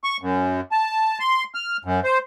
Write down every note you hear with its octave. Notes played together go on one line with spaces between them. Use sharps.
C#6
F#2
A5
C6
F6
F#2
C5